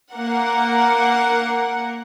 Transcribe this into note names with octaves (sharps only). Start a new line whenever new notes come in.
A#3 A#4 F#5